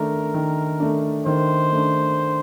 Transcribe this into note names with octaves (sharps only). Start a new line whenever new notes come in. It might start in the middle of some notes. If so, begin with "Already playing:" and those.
Already playing: D#3 A3 D4 A#4
D#3
A3 D4
D#3 C5
A3 D4